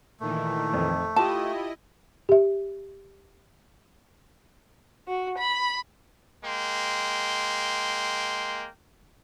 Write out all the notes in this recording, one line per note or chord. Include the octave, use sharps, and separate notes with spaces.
A#2 D#3 E3 A3
F2
E4 F4 G4 D#5 A5
G4 E5
F#4
B5
G#3 A#3 G5 C6